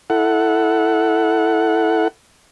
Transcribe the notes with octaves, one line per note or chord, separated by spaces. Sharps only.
E4 A4 F#5